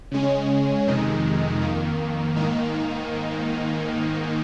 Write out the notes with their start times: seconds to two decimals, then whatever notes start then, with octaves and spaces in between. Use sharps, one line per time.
0.11 C#3 G#3 C#4
0.87 F2 C3 D#3 G#3 D#4
1.61 F2 D#3 A#3
2.36 G#2 D#3 A#3 D#4